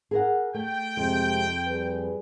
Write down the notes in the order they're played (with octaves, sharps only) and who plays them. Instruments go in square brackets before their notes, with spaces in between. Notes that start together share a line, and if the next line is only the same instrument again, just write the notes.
[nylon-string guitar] G#4 A#4 F#5
[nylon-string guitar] A3 [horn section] G5
[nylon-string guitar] F2 [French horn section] C3 G#3
[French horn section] G3 G#4 B4